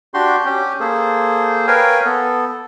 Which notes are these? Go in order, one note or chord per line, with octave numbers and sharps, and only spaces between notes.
D4 F#4 G4 C6
C#4 G4
A#3 G#4 A4 C5
A#4 B4 C#5 F5 G5 G#5
B3 A4